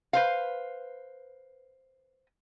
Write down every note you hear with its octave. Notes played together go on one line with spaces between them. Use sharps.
B4 C5 F5